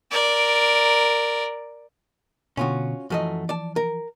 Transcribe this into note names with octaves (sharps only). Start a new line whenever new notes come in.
A#4 D5
B2 D3 C#4 F4 F#4
F#2 E3 F3 A3 D#5
D5 A5
A#4